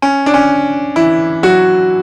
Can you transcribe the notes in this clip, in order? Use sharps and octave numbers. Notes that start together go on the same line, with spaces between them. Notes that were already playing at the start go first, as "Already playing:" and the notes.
C#4
D4
C#4
E3 E4
F#3 F#4